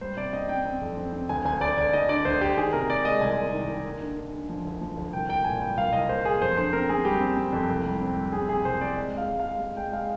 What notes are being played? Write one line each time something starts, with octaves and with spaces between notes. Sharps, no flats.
G3 C5
C3 D5
C4 D#5
C4 G5
C4
F2
C4
C4
D2 G#5
D2 G#5
D2 D5
D2 D5
D2 D#5
D3 D5
D2 C5
D2 G4
D#3 G#4
C3 A#4
C3 D5
G#3 D#5
C2 G#5
C2
D#3
D#3
A#3
D3
D3
D3
F3
D2
F3
D2
C2 G5
A#3 G5
A#2 G#5
G3 G5
C2 F5
C2 D#5
A#3 C5
A#3 G#4
F2 C5
D3 C5
C4 A#4
C4 G#4
G3 G4
C4
C4
F2
C2
G3
C4
G3
C4 G#4
C3 G#4
C2 C5
C4 D5
G#3
G#3 F5
G#3
F5
G#3
G#3
G#3 G5
G#3 F5